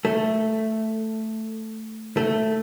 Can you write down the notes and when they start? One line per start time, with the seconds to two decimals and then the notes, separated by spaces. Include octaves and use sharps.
0.05 A3
2.17 A3